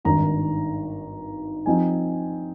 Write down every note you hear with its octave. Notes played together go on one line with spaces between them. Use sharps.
G#1 G2 D#3 A#5
F3 C4 D#4 G#5